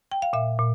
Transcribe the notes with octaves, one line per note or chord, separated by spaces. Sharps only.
G5
F5
A#2 E5
A#2